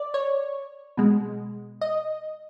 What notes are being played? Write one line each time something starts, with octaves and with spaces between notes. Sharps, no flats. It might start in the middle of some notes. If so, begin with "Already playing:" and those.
Already playing: D5
C#5
B2 G#3
D#5